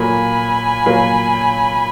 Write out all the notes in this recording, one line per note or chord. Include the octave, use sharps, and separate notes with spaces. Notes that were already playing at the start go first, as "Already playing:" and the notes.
Already playing: A#2 F#3 A#3 G#5 B5
A#2 F#3 A#3